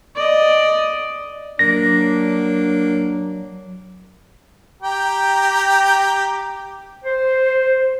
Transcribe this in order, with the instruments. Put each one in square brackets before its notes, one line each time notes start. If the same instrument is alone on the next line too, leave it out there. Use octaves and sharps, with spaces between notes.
[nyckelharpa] D5 D#5
[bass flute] F#3 [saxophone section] A#3 D4 [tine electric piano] A#6
[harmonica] G4 G5 A#5
[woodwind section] C5